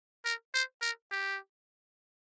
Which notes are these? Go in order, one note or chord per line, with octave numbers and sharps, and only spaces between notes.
A#4
C5
A#4
G4